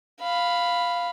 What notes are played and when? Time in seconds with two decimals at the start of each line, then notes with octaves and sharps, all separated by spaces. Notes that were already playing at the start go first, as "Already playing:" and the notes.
0.21 F5 B5